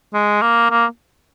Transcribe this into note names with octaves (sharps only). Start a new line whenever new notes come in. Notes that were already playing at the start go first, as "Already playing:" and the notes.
G#3
A#3
A#3